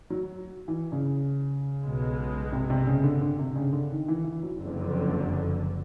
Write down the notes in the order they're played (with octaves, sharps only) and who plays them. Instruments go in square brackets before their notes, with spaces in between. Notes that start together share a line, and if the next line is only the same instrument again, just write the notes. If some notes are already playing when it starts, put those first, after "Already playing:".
[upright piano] F#3
E3
C#3
[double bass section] B1 B2 G#3
[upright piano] C3
C3
C#3
D3
D3
C3
C#3
D3
D#3
E3
E3
F#3
[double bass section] F#1 F2 D3